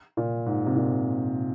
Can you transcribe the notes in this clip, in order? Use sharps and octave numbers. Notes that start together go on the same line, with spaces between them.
A#2
G#2
C3
A#2